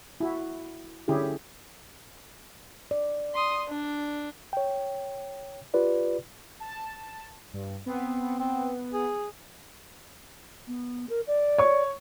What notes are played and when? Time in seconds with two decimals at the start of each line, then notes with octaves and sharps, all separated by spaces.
0.20 E4 F#4
1.08 D3 C#4 E4 G4 G#4
2.91 D5
3.35 C6 D#6
3.68 D4
4.53 C#5 G5
5.74 F4 G4 B4 D5
6.60 A5
7.53 G2
7.86 B3 C4
8.40 C4
8.93 G#4
10.67 B3
11.09 A#4
11.27 D5
11.58 C#5 C#6